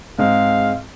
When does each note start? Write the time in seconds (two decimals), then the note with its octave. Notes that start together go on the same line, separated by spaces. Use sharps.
0.19 G#2 G#3 C4 F5